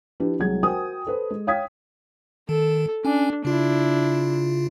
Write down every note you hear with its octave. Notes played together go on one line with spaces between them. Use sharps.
F3 D4 E4 G4 B4
C2 F#3 G#3 G#4 G#6
F#4 A#4 C5 G5 G#5 D#6
A4 B4 C5
G#3
C#5 F5 G5 D#6 G#6 B6
D#3 A4
C#4 D4 G#5
C#3 D4 E4 F4